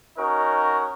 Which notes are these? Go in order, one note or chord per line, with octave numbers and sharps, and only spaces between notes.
C#4 D#4 F#4 A#4